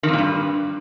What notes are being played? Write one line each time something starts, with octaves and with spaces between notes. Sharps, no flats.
D#3
F2
A#2
G2